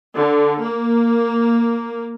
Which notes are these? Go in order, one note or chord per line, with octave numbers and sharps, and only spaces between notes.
D3
A#3